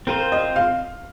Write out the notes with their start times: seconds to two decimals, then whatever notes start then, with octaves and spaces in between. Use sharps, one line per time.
0.07 C4 F4 A#4 C5
0.32 D#5
0.56 F5